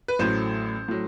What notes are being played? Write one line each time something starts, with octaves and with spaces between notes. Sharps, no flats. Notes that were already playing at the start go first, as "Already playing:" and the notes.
B4
A1 A2 F#3 C5
A2 F#3